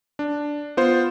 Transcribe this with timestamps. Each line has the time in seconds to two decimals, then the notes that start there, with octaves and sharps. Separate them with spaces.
0.19 D4
0.77 B3 F4 C5